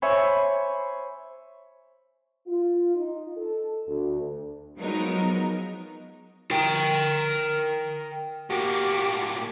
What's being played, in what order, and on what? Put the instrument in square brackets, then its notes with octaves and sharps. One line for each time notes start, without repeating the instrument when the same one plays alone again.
[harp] C5 C#5 E5 G#5 B5
[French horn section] F4
D#4
A4
D2
[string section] F3 F#3 G#3 B3 D#4 A#4
[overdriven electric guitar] A#4 G5
[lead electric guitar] A2 A#3 [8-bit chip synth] F#4 G4 D6